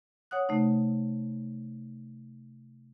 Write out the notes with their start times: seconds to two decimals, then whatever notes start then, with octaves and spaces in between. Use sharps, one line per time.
0.31 C#5 F#5 D#6 F#6
0.49 C3 A3 D#4